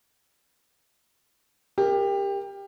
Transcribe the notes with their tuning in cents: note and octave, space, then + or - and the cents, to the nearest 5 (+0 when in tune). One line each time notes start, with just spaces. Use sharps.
G4 +20 A#4 +0